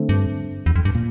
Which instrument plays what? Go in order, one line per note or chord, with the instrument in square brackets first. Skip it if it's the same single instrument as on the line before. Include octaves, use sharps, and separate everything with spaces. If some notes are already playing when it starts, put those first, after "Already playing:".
Already playing: [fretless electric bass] D3 A3 C4
[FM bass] G2
E2
F2
G2
[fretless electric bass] A#2